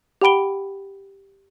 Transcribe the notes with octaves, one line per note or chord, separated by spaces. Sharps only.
G4 F#5 G5 B5 D7 G7